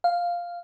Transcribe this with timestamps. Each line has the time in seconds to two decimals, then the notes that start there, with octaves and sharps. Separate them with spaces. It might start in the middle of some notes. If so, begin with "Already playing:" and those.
0.04 F5